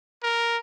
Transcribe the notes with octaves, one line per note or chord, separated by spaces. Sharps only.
A#4